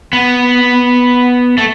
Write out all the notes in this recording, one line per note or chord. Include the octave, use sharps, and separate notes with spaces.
B3
A3